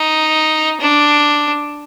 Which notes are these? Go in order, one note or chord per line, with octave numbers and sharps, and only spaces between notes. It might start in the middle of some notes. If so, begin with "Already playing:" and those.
Already playing: D#4
D4